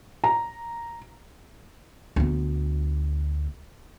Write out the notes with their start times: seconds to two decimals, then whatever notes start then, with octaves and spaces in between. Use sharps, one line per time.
0.24 A#5
2.16 D2 B3